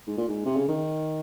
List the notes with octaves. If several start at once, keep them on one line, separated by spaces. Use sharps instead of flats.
G#2
A#2
G#2
C3
C#3
D#3